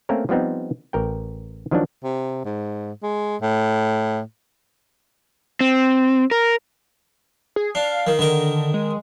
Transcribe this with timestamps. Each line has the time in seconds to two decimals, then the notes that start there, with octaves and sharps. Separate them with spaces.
0.09 A3 A#3 C4 C#4 A#4
0.29 F3 G3 B3 C4 D#4
0.93 A1 A#4 G5
1.71 D#3 F3 F#3 C#4 D4
2.04 C3
2.45 G#2
3.03 G#3
3.41 A2
5.61 C4
6.31 A#4
7.56 G#4
7.75 D4 F5
8.07 D#3
8.19 D3 D#3 A#4
8.74 G#3